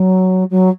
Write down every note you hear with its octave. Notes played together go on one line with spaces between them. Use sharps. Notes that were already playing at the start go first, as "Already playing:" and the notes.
Already playing: F#3
F#3